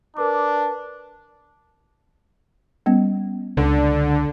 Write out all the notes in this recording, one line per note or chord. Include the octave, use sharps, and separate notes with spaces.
D4 A#4 B4 D6
G3 B3 C#4
C#2 D3